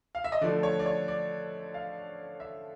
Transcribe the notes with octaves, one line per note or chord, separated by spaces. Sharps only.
F5
E5
D#5
D3 F3 A3 D5
C#5
D5
C#5
D5
F5
E5